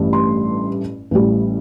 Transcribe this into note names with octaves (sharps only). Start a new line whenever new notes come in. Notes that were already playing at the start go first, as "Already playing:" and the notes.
Already playing: A1 G2 E3 A3
C6
A1 A2 G3